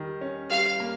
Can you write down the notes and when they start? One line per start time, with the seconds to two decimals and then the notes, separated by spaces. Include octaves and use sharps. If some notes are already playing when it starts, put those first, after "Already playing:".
Already playing: D#3 G3
0.21 C#4
0.50 G3 F5
0.80 A#3